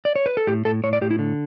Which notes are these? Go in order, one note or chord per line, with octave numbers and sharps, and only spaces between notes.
D5
C#5
B4
A4
A2 G4
A2 A4
A2 C#5
D5
A2 G4
E4
D3